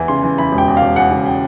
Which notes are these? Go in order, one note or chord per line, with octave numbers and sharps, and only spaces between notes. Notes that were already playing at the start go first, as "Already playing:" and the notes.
Already playing: E2 E3
C#3 C6
E3
E3 B5
E1
G5
E2
E1 F5
E2 F#5
C#3
G5